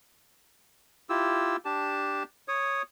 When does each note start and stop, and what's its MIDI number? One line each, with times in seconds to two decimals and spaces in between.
1.09 1.56 64
1.09 1.56 65
1.09 1.56 67
1.09 1.56 88
1.65 2.23 62
1.65 2.23 67
1.65 2.23 81
2.48 2.82 73
2.48 2.82 87